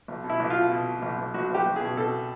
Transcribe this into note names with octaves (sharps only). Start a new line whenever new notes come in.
B1
B2
E4
B1
F4
B2
B2
B2
B1
B1
B1 F#4
B1 G4
B1
G#4
B2
B2 A4